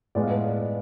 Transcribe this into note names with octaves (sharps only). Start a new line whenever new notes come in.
A2 G#3 B3 D5
F5
B4 D5